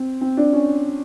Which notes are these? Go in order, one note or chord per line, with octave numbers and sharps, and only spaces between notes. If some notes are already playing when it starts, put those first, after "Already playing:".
Already playing: C4
C4
D4
C#4